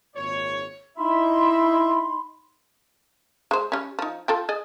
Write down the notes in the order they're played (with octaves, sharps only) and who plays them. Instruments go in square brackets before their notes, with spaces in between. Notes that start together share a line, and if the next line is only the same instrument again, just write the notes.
[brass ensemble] G#1 A#2 C#5
[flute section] D#4 B5 C6 [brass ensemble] E4 E5
[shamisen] G#3 C5
G3 C#4
F3 D#4
F4 A4 G5
G#4 D5 D#5